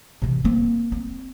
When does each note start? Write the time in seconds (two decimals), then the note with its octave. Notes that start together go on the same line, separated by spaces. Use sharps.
0.22 C3 E3
0.44 A#3 C4
0.92 C4